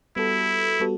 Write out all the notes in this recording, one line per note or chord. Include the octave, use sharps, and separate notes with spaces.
G3 B3 E4 F#4 A4
G3 B3 F#4 A4